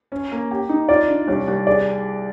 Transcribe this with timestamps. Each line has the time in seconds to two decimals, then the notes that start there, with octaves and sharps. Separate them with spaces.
0.12 C#4
0.32 A#3
0.51 G4
0.69 D#4
0.89 F4 D5
1.08 D4
1.27 C2 C#5
1.47 C2
1.67 G#4 D5